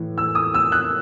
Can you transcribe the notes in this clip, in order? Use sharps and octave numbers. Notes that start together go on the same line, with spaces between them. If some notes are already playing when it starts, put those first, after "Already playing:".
Already playing: A2 E3
E6
D#6
E6
F#6